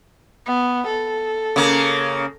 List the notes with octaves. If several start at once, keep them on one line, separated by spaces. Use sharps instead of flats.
B3
A4
C#3 A#3